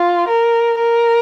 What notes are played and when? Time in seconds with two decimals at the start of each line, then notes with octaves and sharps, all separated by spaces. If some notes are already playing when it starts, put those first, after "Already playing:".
Already playing: F4
0.28 A#4
0.80 A#4